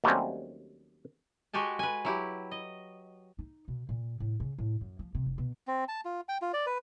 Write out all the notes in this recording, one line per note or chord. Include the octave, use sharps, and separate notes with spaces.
D#2 F#3 G3 A3 C4 C#4
G#3 F#4 G4 G#5 A5
B4 G#5
F#3 E4 G4
D#5
D#4
B2
A#2
A2
C#3
A2
F#2
F3
C3
F1
B2
C4
A5
F4
G5
F4
D5
B4